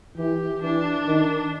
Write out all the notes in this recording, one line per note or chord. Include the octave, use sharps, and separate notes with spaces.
E3 G4
E3 D4
D#3